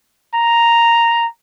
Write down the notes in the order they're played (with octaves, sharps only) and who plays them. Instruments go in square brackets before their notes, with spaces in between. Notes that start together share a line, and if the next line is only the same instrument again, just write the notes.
[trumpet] A#5